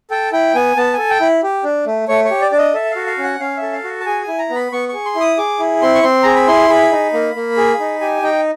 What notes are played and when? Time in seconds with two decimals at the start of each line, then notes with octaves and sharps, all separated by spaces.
0.11 A4 G5
0.32 E4 G5
0.55 B3 G#5
0.77 B3 A5
0.93 A4 G#5
1.10 G5
1.21 E4
1.43 G4
1.64 D4
1.86 A3
2.08 A3 C#5
2.25 C#5
2.31 G4
2.41 D5
2.52 D4 D5
2.58 D#5
2.74 A4 E5
2.91 F5
2.96 F#4
3.07 F5
3.18 C#4
3.23 F#5
3.40 C#4 F5
3.57 A4 E5
3.72 F5
3.84 F#4
4.00 A5
4.06 G#4 G#5
4.22 G#5
4.28 E4
4.39 A#5
4.50 B3
4.56 B5
4.72 B3 C#6
4.89 G#4 C#6
5.05 C6
5.16 E4
5.21 D#6
5.38 G#4 D6
5.59 E4
5.82 C4 C6
5.95 C#6
6.03 C4 C6
6.23 G#4 A#5
6.36 B5
6.48 E4 C6
6.69 G#4 B5
6.92 D#4
7.13 A#3
7.35 A#3
7.57 G#4
7.80 D#4
8.01 G4 G#5
8.23 D#4 G5